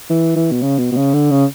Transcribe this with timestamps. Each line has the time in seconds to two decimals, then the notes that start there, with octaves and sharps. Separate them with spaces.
0.09 E3
0.36 E3
0.51 B2
0.62 C#3
0.78 B2
0.92 B2
0.96 C#3
1.13 D3
1.31 C#3